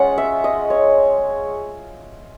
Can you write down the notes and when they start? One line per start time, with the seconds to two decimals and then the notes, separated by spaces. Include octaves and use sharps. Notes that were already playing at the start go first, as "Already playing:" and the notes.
Already playing: G#3 C#4 F4 F#5
0.18 E5
0.44 D#5
0.70 C#5